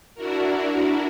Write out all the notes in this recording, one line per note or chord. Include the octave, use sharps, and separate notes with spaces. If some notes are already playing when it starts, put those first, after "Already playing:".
D4 E4 F#4 A#4